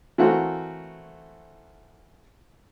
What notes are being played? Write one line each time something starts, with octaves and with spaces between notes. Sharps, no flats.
E3 A3 A#3 C4 F#4